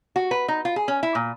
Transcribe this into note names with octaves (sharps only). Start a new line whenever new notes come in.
F#4
B4
D#4
F4
G#4
C#4
E4
A#2